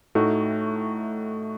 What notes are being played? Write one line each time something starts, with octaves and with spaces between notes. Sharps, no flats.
A2 A3 D#4 F#4